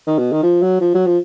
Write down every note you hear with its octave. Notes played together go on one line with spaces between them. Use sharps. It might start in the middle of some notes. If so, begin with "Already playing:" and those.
D#3
B2
D#3
F3
F#3
F3
F#3
F3